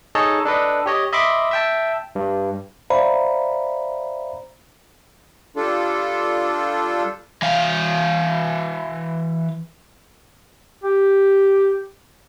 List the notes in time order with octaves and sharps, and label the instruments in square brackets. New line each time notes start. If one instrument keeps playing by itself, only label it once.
[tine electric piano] D#4 G#4 A4 C#5 D#5 A5
D4 A4 B4 D#5
G4 C#5 D#5
D#5 E5 B5 C6 D6
E5 G5 A5
G2
C5 D5 E5 F5 A#5 B5
[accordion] G3 D4 F4 A4
[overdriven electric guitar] E3 F5
[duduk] G4